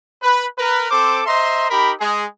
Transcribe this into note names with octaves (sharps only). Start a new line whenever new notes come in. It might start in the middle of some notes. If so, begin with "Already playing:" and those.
B4
A#4 B4
C4 A4 C5 D6
C5 D#5 E5 A#5 C6
D#4 G4 A#4 B5
G#3 G#4